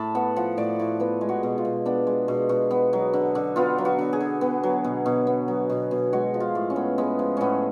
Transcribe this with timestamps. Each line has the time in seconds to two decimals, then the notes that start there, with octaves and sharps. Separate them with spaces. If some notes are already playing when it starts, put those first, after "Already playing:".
Already playing: A2 A5 B5
0.15 B3 F#5
0.36 F3 F#5
0.57 A2 D5
0.79 A2
1.00 B3 B4
1.21 G#3
1.29 F#4
1.43 B2
1.58 F4
1.65 B2
1.86 B3 D4
2.07 G#3
2.28 B2
2.49 B2
2.71 B3
2.93 F#3
3.13 D3
3.35 D3
3.56 B3 F4
3.78 F#3
3.85 F#4
3.98 D3
4.13 G#4
4.20 D3
4.41 B3
4.63 F#3
4.84 B2
5.06 B2
5.27 B3
5.48 F#3
5.69 B2
5.91 B2
6.13 G#3 F#4
6.34 F3
6.40 F4
6.55 A2
6.70 C#4
6.76 B3
6.98 G#3 B3
7.19 F3
7.37 A2 B3 C#4